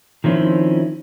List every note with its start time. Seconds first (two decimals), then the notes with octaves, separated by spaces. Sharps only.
0.24 D#3 F3 C4 C#4 E4